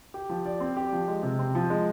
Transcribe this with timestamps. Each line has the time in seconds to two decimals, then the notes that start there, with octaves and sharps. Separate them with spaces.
0.14 G4
0.30 F3
0.45 D5
0.60 C4
0.77 G4
0.93 F3
1.08 G#3
1.23 C3
1.39 C4
1.55 F3
1.70 G#3